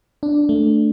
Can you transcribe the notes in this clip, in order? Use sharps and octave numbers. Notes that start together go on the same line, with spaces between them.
D4
A3